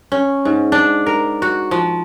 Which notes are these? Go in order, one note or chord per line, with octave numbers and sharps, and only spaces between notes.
C#4
G#2
D4
A#4
F#4
F3